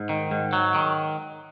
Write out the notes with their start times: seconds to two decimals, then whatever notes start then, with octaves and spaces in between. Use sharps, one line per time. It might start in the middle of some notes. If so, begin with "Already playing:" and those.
Already playing: G#2
0.09 D#3
0.31 G#2
0.53 F#3
0.75 D#3